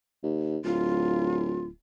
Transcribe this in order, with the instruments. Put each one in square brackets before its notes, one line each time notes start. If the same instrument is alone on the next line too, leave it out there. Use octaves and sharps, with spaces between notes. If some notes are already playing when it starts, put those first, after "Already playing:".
[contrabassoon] D#2
[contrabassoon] D1 [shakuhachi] F4